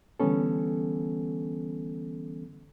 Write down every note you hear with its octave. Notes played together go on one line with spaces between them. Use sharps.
D3 E3 G3 B3 C#4 A4